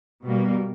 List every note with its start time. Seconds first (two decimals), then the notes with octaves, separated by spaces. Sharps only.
0.24 B2 G3 A#3